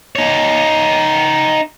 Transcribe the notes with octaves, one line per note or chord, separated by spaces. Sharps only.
D#4 C#5